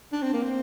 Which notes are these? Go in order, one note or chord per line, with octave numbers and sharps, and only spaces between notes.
D4
C4
A#3
C4